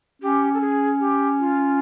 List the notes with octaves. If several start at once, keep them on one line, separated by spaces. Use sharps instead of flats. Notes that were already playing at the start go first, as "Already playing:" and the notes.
C#4 G4
A4
G#4
G4
F4